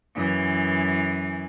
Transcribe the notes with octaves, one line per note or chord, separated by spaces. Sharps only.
F#2 E3